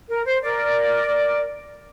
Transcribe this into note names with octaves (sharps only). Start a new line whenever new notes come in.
A#4
C5
A#4 D5